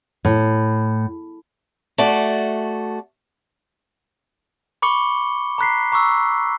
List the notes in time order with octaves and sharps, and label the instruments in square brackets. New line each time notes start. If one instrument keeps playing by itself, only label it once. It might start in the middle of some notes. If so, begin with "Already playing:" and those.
[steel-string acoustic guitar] A2
A3 F#4 D5
[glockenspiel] B5 C#6 D6 C#7 G7
A#5 B5 F#6 B6 C7
A#5 C#6 D6 E6